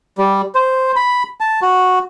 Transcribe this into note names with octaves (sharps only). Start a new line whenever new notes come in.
G3
C5
B5
A5
F#4